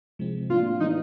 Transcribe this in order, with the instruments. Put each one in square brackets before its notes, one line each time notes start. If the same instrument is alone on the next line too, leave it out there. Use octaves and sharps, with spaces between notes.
[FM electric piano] C3 F3 G#3 C4
[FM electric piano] A2 F3 A#3 D4 [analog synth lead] F4
[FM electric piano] E3 G3 B3 D4 [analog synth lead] D#4